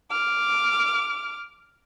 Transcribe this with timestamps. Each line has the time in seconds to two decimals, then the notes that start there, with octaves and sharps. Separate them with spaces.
0.11 D6 F6